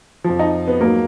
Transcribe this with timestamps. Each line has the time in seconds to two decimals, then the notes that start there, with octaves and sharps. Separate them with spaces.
0.24 F3
0.29 F2
0.39 D#4
0.68 B3
0.81 G#2 F#3 A#3